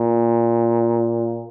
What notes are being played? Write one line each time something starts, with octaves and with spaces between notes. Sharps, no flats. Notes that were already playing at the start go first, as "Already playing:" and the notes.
Already playing: A#2